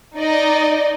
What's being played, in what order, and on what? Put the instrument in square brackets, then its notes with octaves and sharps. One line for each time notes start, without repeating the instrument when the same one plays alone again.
[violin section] D#4 D5 D#5